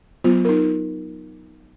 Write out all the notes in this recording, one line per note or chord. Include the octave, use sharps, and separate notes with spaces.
F#3 B3 F4 C5
D#4 A#4